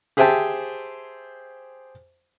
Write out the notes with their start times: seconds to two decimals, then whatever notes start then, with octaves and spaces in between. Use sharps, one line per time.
0.17 G4 G#4 C5 E5 G5 A5